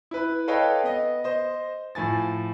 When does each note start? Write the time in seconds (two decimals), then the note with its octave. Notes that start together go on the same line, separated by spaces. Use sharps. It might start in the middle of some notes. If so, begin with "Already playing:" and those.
0.11 E4 B4
0.48 A4 B4 C#5 D#5 F5 G5
0.84 B3 D#5
1.24 C5 D#5
1.95 A2 F3 G#5 A6